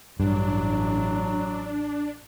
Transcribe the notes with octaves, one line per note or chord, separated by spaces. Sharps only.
A1 G2 F#3 D4